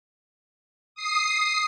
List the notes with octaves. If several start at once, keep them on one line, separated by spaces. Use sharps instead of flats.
D#6 C7